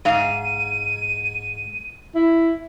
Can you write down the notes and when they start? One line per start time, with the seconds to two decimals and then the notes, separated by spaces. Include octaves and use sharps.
0.05 G#2 F5 D#7
2.15 E4